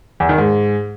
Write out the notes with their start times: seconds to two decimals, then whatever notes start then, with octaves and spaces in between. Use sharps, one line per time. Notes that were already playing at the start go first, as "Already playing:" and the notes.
0.20 E2
0.29 D#3
0.38 G#2